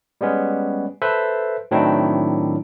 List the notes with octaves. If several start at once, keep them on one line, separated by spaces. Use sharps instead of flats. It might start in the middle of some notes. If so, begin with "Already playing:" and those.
G3 G#3 B3 C#4
A4 B4 C5 E5
A2 D#3 F#3 C4 D4 E4